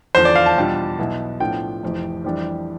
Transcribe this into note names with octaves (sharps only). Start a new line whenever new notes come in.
E2 D3 F3 C5
D5
F5
A5
E2 B2 G3 D4 F4
B1 B2 B3 E4
A2 F3 B3 D4 F4 G5
F1 F2 E3
F2 E3 G3 D4